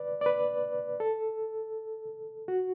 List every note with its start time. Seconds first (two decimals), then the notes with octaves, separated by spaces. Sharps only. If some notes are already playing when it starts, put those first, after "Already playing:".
Already playing: B4 D5
0.21 D5
0.26 B4
1.00 A4
2.48 F#4